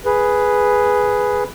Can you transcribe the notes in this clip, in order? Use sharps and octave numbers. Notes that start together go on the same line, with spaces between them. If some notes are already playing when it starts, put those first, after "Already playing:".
G#4 B4